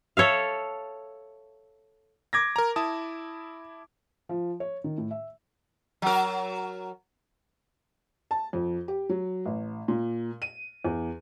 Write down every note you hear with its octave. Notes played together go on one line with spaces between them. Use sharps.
A4 C#5 E5 F5
D6 G#6 A#6
A#4 A#5
E4 A5 D#6
F3
C#5
D#3
A2
E5
F#3 A#4
A5
F2
G4
F#3
A1
A#2
D#7
E2